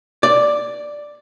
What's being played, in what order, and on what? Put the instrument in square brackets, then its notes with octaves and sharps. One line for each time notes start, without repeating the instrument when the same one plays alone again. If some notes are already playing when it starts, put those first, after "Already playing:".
[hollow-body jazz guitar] D5